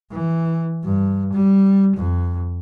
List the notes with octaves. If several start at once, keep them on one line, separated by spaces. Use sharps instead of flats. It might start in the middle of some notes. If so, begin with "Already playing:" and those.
E3
G2
G3
F2